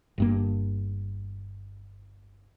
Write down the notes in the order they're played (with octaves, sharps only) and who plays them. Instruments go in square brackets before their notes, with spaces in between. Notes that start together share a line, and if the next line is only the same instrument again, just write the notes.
[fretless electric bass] G1 G2 A#3